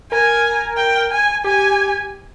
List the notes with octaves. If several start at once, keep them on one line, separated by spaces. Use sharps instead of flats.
A#4 G#5
G5
G#5
G4 G#5